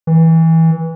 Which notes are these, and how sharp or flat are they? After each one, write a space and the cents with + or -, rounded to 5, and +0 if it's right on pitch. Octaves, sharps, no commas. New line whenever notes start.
E3 -20